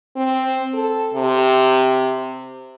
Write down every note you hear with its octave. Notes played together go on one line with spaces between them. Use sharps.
C4
A4
C3